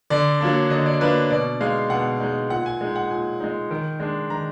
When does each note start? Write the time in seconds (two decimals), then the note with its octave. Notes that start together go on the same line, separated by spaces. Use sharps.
0.10 D3 D5
0.41 F#3 A#3 D4
0.70 D3 D#5
0.86 D5
1.01 F#3 A#3 D4 B4
1.30 B2 D5
1.61 G#3 D#4 F5
1.90 B2 F#5
2.20 G#3 D#4
2.50 A#2 F#5
2.66 G#5
2.81 G#3 D#4
2.96 F#5
3.10 A#2 G#5
3.40 G#3 D#4
3.71 D#3
4.00 G#3 D4
4.30 D#3 A#5